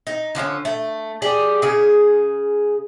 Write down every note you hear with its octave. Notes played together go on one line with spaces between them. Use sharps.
D#4
D3 F3 A3 C#4
A3
G4 G#4 D5
C#3 G#4